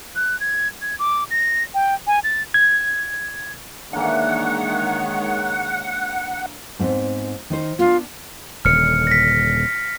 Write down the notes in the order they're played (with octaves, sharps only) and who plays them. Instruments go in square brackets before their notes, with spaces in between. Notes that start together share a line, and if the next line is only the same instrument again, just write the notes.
[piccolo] F#6
G#6
G#6
D6
A#6
G5
G#5
A6
[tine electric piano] G#6
[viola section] D#3 G#3 C#5 [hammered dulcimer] E3 A#3 D4 [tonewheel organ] F#5
[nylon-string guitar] G#2 B3 C4
D#3 D#4 C5
[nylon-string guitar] B3 D4 [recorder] F4
[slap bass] D#1 D3 [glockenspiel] F6 C#7
[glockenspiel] A#6 B6